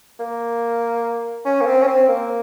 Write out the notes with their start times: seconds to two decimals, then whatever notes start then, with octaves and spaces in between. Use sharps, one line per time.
0.20 A#3
1.45 C#4
1.62 A#3
1.66 C4
1.82 C#4
1.88 C4
2.08 A#3